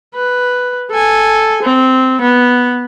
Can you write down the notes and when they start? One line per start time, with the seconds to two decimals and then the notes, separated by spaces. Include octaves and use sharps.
0.15 B4
0.91 A4 G#5
1.63 C4
2.22 B3